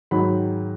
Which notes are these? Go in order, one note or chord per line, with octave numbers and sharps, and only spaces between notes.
G#2 D#3 F#3 B5